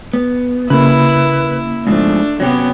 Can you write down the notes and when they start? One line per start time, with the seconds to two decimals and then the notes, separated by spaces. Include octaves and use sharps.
0.13 B3
0.70 C#3 A#3 E4 B4
1.87 G#2 B2 F3 A3 D4
2.40 C3 F#3 B3 C#4 G4